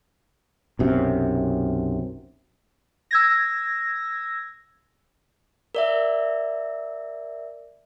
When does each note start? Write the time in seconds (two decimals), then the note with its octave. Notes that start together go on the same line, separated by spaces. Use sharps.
0.79 B1 F#2 C3
3.11 E6 G#6 A#6
5.75 A#4 D5 E5